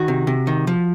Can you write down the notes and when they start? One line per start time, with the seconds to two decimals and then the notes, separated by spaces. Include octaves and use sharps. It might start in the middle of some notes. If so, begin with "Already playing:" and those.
Already playing: D#3 F#4
0.08 C3
0.27 C3
0.47 D#3
0.67 F3